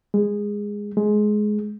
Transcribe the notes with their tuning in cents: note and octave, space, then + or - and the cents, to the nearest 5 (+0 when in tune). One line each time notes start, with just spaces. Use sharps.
G#3 -15
G#3 +15